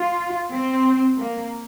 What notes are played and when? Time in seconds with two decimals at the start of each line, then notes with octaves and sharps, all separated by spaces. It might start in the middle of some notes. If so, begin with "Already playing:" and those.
Already playing: F4
0.52 C4
1.18 A#3